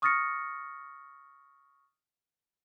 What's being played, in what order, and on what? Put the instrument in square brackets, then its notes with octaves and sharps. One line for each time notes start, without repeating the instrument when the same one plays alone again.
[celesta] C#6 D#6 F6 A6 A#6 C#7